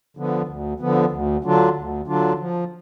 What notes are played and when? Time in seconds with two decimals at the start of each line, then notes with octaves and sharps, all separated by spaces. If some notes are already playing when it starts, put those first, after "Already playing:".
0.17 D3 F3 B3
0.48 D2
0.80 D3 F3 B3
1.12 D2
1.44 D3 F#3 D4 F4
1.76 D2
2.07 D3 F#3 D4 F4
2.39 F3